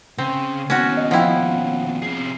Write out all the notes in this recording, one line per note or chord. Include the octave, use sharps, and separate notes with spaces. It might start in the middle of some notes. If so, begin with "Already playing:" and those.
C#3 C4
D#2 B2 C#4 F#4
D#5
F3 E4 F#5 G5
C3 G#4 C7